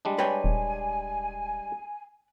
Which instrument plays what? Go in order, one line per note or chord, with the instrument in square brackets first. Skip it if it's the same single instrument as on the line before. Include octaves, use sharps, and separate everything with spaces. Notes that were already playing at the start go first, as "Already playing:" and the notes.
[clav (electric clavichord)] G3 G#3 D4
[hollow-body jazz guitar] B4 C#5 G5 [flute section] G#5
[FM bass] D#1